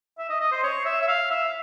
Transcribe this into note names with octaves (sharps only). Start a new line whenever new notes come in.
E5
D#5
D#5
C5
C#5
E5
E5
F5
E5